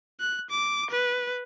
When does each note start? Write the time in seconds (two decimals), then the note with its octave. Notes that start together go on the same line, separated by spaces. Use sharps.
0.20 F#6
0.51 D6
0.91 B4